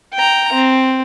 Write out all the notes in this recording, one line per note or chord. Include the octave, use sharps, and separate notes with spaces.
G5 A#5
C4